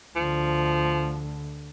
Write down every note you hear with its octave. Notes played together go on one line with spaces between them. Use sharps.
D2 D3 F3